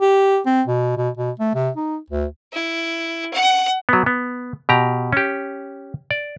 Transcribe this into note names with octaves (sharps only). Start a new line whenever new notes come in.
G4
C4
B2
B2
B2
A3
C3
D#4
D2
E4
F#5
F#3 B3
B3
B2 G4 A#5
C#4 G4
D5